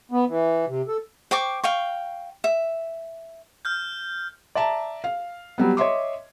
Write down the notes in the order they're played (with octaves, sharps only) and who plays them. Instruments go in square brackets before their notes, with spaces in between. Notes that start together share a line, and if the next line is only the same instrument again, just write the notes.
[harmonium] B3
E3
C3
A4
[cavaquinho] C5 G5 C#6 D6
F5 G5 C#6
E5
[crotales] F6 G6
[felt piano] D5 E5 A5 A#5
F5
F#3 G3 B3
C#5 D#5 E5 C6 D6